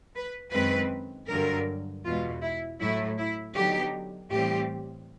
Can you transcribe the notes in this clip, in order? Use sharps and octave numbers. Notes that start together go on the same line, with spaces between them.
B4
F#2 D#3 G#3 C4 B4
G2 D3 F#3 A#4
E2 B2 G#3 F4
E4
A2 F#3 A3 E4
E4
D3 F#3 B3 D#4 G4
A2 E3 G3 C4 G4